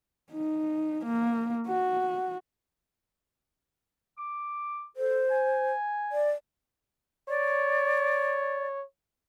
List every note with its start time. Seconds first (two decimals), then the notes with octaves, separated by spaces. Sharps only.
0.32 D#4
1.05 A#3
1.68 F#4
4.18 D6
4.97 A4 C5
5.30 G#5
6.12 D5
7.29 C#5 D5